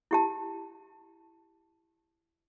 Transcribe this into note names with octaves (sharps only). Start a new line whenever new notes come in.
E4 G4 A5